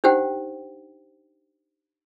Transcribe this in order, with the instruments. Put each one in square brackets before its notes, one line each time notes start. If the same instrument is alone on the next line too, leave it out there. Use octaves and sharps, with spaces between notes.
[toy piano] D4 D#4 G4 C5 F#5 G5